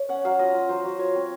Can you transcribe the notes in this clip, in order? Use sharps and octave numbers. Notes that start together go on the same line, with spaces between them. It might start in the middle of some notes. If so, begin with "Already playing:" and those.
Already playing: C#5
C#4 F#5
F#3 F5
F4 D#5
F4
F#3 C5
F#3
F4 C#5
C4